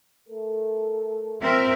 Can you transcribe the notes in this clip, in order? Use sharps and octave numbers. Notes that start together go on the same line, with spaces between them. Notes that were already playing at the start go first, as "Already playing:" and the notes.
A3 A4 A#4
A#2 C4 A#4 E5